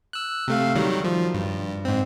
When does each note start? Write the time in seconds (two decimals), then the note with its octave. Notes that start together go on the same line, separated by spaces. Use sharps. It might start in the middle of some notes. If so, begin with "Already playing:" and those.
0.13 E6 F#6
0.48 C3 A3 F5
0.75 D#3 F#3 G3
1.05 F3
1.34 G2
1.85 G#2 C4